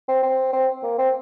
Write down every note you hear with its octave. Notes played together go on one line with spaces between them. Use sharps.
C4
C4
C4
A#3
C4